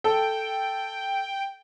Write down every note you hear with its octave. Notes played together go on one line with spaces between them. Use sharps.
A4 G5